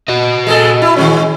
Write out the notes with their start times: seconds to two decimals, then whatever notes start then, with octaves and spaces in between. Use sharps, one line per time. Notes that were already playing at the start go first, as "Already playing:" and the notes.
0.08 F#4 D#5
0.47 G#3 G#4 A4
0.82 E4
0.96 D#3 G#3 C#4